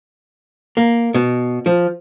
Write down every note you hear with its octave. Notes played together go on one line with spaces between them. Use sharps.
A#3
B2
F3